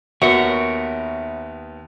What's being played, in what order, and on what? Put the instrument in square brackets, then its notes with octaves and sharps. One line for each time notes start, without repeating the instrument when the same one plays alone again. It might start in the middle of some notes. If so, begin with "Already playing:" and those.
[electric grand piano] D#2 B3 [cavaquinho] F#4 [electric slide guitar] A#4 C#5 [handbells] E5